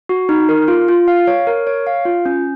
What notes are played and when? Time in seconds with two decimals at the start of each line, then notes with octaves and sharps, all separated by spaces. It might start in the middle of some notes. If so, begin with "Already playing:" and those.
0.09 F#4
0.29 D#4
0.49 A#4
0.68 F4
0.88 F4
1.08 F5
1.27 C#5
1.47 A#4
1.67 C#5
1.87 F5
2.05 F4
2.25 C#4